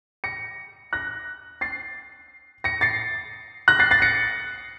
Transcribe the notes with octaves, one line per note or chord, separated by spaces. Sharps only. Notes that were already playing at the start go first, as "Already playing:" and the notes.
A#6 C#7
F#6 A#6
A6 C7
A#6 C#7
A6 C7
F#6 A#6
A6 C7
A6 C7
A#6 C#7